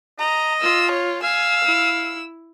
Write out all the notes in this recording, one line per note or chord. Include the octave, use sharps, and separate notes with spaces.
D#5 A#5
F4 E6
C#5
F5 G#5 E6
E4